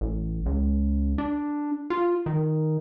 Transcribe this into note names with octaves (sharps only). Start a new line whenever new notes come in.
A1
C#2
D4
F4
D#3